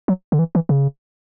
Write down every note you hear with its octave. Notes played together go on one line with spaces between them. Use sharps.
F#3
D3
E3
E3
C#3